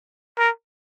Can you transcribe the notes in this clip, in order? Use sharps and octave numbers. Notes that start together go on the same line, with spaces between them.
A#4